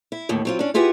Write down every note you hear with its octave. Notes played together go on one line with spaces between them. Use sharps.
E4
D#2 A2 D3
F#3 C4 F4
C#4 D4
E4 F4 G4 G#4 B4 F#5